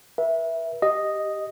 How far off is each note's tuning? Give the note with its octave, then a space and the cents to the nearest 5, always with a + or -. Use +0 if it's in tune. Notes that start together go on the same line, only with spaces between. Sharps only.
B4 -40 E5 +0
G4 +0 D#5 +0